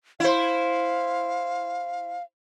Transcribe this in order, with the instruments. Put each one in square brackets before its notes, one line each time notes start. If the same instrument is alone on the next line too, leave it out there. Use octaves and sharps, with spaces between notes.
[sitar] E4 C5 [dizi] F5